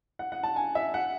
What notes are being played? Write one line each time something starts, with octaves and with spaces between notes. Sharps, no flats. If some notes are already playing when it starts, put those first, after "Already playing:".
F#5
F#5
A5
G#5
E5
F#5